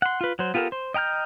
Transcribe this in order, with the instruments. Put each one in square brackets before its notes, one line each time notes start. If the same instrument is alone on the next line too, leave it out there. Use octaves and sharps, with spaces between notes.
[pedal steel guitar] F#5 C6
F4 B4
F#3 C5
B3 F4 G4 A4 A#4
C5
D#5 G5 A#5 F6 G6